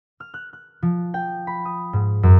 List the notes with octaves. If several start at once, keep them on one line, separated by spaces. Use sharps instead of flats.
F6
F#6
F#6
F3
G5
B5
D#6
G#2
F#2